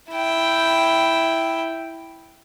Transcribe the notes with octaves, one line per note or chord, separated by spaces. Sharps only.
E4 G5